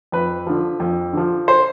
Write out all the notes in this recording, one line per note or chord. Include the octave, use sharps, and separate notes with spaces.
F2 B4
D3 F3
F2
D3 F3
C5